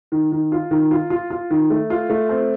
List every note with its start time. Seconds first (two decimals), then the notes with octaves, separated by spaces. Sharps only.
0.12 D#3
0.32 D#3
0.52 F4
0.71 D#3
0.91 F4
1.10 F4
1.30 F4
1.50 D#3
1.70 A3
1.90 F4
2.10 A3
2.29 C4